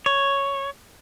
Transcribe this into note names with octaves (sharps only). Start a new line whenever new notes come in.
C#5